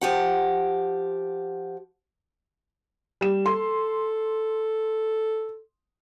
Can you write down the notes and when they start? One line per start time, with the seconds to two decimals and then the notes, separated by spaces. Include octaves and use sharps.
0.01 F3 G4 F#5
3.21 G3 E7
3.46 A4 C6